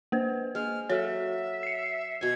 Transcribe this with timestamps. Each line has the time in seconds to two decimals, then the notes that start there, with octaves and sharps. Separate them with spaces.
0.12 A#3 B4 C5
0.55 G#3 F6
0.89 F#3 A4 C#5 E5
1.63 C7 C#7
2.21 B2 G#5 G#6